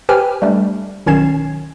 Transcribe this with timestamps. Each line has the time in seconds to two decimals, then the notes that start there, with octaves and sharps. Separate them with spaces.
0.09 G4 B4 C5 G5 G#5 F6
0.42 G3 A3 D4
1.06 B1 D#3 C#4 G#6 C7 E7